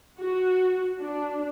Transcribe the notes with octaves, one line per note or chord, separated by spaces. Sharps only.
F#4
D4